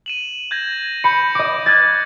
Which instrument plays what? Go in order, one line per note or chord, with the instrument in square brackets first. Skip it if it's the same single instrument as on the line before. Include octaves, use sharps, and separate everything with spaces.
[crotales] D#7 E7 F#7
G6 G#6 A#6
[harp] B5 [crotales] G6 C#7
[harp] D#5 D6
F#6 G#6 A6